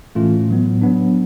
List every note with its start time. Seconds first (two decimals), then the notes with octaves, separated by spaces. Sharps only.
0.15 A2 E3 A3 C#4 F4
0.49 A2 F#3 B3
0.81 F#3 B3 D4